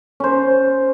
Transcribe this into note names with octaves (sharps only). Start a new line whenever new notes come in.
C#4 C5